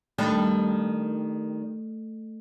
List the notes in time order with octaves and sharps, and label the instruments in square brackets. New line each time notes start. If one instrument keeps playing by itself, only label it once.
[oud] D#3 G3 D4 [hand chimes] A3